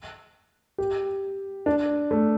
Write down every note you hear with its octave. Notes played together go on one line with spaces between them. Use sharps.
G4
D4
A3